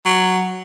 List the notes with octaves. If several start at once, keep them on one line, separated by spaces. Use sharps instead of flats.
F#3